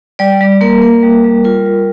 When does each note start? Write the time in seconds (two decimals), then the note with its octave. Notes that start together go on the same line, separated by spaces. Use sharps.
0.19 G3 D5
0.41 G3
0.61 A#3 A#4
0.82 A#3
1.03 G3
1.24 G3
1.44 F4 A#4
1.66 G3